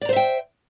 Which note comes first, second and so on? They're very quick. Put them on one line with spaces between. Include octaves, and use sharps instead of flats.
D5 A#5 C5 E5 G5